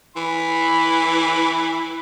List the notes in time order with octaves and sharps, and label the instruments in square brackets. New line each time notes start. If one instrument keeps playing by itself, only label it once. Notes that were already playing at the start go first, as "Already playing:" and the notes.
[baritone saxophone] E3 [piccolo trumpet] B5